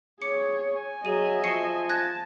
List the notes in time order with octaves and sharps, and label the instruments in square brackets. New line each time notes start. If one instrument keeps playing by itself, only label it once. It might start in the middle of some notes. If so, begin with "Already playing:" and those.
[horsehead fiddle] G#4 C#5 [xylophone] D6 C#7
[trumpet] G#5
[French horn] F#3 [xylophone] G#4 D#7 [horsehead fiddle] D#5 E5
[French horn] F3 [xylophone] C#6 C7 C#7
[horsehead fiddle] A5 [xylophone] F#6 G#6 A#6